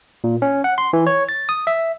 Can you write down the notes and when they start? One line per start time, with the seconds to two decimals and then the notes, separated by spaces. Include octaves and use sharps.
0.24 A#2
0.42 C#4
0.64 F#5
0.78 C6
0.93 E3
1.07 C#5
1.29 A6
1.49 D#6
1.67 E5